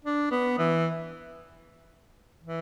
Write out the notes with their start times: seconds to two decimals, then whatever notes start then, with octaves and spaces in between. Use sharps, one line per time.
0.05 D4
0.31 B3
0.58 E3
2.43 E3